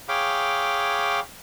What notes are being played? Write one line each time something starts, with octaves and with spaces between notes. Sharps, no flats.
G#4 C#5 F5 G5 B5 D6